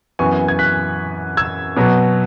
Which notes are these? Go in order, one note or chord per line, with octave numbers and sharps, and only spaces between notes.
F#2 E3 B3 G#5 C#6
G#6
F#6 B6
E6 G#6
B2 F#3 B3